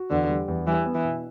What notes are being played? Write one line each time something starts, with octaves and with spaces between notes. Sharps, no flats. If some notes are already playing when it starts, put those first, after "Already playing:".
Already playing: F#4
E2 D3
G3
E2
E3 G3
B3
E3
B2